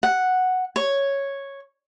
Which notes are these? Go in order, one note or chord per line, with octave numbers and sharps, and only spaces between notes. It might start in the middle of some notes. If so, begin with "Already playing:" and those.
F#5
C#5